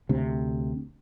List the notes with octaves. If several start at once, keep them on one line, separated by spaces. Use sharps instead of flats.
D2 C3